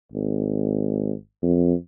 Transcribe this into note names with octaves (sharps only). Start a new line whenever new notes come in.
G#1
F2